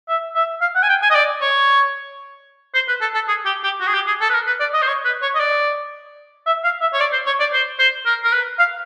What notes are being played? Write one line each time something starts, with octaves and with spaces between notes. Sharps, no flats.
E5
E5
F5
F#5
G#5
G5
G#5
D#5
D5
C#5
C5
B4
A4
A4
G#4
G4
G4
F#4
G#4
G4
G#4
A4
B4
A#4
B4
D5
D#5
C5
C#5
B4
C#5
D#5
D5
E5
F5
E5
C#5
D5
C5
C#5
D5
C5
C5
A#4
A#4
B4
F5